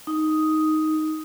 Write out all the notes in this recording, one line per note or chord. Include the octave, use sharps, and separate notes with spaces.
D#4